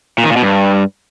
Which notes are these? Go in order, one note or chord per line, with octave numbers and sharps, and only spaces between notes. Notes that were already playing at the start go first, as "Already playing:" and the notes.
A#2
D#3
A#2
B2
G2